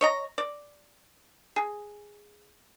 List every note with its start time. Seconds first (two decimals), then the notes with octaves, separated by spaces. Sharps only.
0.01 C#5 D#5 A#5
0.38 D5
1.56 G#4